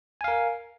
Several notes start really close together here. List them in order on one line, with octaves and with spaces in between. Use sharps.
G#5 F5 A#4